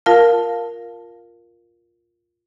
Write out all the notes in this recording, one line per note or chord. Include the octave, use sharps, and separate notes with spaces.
F4 A#4 F5 A5